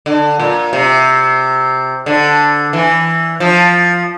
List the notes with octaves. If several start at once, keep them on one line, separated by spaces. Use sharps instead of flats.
D3
A#2
C3
D3
E3
F3